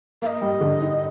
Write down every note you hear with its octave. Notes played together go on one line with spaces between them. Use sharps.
A#3 D#5 F5
G3
D3
D#4